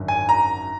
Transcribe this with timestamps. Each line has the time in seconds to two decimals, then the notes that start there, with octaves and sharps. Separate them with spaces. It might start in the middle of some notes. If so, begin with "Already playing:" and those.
Already playing: G#1 F#2 D3
0.08 G#5
0.29 A#5